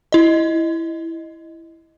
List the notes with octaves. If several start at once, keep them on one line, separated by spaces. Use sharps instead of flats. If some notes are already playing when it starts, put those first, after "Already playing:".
E4 D#5